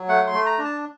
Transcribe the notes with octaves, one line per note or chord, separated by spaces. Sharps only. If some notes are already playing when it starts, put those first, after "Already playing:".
Already playing: F#3
A3 F#5
C6
A3
A#5
D4
A5